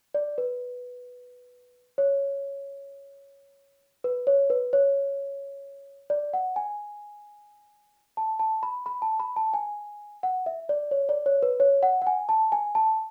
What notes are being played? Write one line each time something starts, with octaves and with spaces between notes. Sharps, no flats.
D5
B4
C#5
B4
C#5
B4
C#5
D5
F#5
G#5
A5
A5
B5
B5
A5
B5
A5
G#5
F#5
E5
D5
C#5
D5
C#5
B4
C#5
F#5
F#5
G#5
A5
G#5
A5